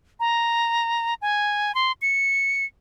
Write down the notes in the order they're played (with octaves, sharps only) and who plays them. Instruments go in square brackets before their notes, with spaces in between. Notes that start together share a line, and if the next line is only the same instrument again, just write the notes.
[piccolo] A#5
G#5
C6
C#7